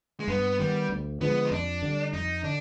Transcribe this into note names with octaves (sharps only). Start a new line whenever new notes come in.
G#3
G2 B3
D#3 G3 B3
D2
D3 F3 G#3 B3
D#4
F2 D4
D3 G3
F2 D#4
D3 D4